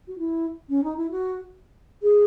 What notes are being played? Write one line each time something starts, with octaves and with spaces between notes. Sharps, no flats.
F#4
E4
C#4
D#4
E4
F#4
G#4